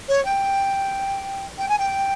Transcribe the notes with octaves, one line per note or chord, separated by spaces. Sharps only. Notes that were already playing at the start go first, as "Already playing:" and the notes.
C#5
G5
G5
G#5
G5